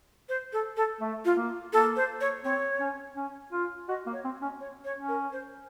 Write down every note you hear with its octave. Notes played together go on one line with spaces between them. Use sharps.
C5
A4
A4
A3
F4
A#3
A#3 A4
C5
C#5
C4 C#5
C#4
C#4
F4
F#4 D#5
A#3
C#5
C4
C#4
C#5
C#5
C#4
A#4
C5